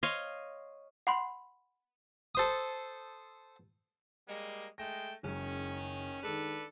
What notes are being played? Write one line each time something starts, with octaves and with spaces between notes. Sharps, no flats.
C#5 D#5 F5 C6
F#5 B5 C6
A4 C5 D#6
G3 G#3 A#3
G#3 A3 G5 A#6
F#1 F#2 D#3 G#3 C#4
D#3 G#3 D4 A4 B4